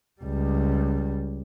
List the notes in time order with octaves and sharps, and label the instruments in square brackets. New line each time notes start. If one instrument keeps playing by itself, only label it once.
[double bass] C#2 G3